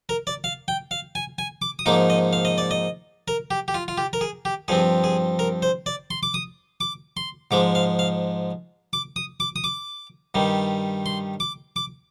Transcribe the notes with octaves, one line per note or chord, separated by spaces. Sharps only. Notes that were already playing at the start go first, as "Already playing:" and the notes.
A#4
D5
F5
G5
F5
G#5
G#5
D6
D#6
G#2 F3 A#3 D#4 D6
D#5
F5
D#5
D5
D#5
A#4
G4
G4
F4
F4
G4
A#4
G#4
G4
G2 F3 C4 G#4
G#4
A#4
C5
D5
C6
D6
D#6
D6
C6
G#2 F3 G#3 D6
F5
F5
D6
D#6
D6
D#6
D6
G2 D#3 G3
C6
D6
D6